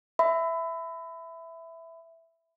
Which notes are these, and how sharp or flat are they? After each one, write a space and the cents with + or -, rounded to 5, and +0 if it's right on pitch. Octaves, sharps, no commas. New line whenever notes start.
E5 +0 B5 +25